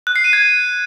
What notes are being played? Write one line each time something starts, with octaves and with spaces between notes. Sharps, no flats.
F#6
C7
D#7
G#6